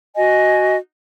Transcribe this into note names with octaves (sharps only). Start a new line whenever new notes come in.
F#4 D#5 G#5